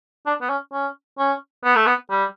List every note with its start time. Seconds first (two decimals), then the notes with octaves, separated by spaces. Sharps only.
0.26 D4
0.41 B3
0.50 C#4
0.73 C#4
1.19 C#4
1.65 B3
1.76 A3
1.87 B3
2.11 G3